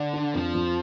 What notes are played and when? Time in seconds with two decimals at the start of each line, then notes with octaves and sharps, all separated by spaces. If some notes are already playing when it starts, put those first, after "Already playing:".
Already playing: D3 D5
0.13 D4
0.34 F2 F3
0.55 F2